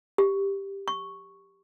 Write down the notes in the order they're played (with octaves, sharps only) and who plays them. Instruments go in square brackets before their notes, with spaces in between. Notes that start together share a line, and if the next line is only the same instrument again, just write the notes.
[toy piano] G4
C#6